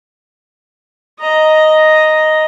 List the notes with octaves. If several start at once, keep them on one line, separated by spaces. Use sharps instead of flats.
D#5 A#5